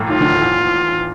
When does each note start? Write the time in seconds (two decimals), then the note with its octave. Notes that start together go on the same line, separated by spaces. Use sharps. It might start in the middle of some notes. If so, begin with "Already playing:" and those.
Already playing: A2 A3 A#3
0.09 D#2 D#3 F4
0.20 D2 D3
0.30 D#2 D#3
0.41 E2 E3